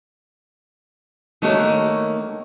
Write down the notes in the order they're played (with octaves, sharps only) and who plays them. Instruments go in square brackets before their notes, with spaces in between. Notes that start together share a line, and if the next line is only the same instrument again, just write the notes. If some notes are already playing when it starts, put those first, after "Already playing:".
[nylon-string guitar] D#3 A3 A#3 F#4 C#5